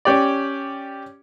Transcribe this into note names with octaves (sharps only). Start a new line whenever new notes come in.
C#4 G4 D5